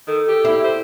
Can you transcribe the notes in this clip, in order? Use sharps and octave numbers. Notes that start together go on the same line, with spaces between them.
D#3 A4
G4
E4
C5